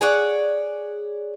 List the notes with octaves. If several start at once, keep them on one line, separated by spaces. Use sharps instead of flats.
G#4 C#5 D5 F#5